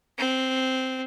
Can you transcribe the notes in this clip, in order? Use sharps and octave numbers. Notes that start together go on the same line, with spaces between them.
C4